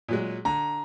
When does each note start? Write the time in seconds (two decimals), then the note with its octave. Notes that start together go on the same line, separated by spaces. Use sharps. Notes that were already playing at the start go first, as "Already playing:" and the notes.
0.08 A#2 F#3 G#3
0.45 D3 A#5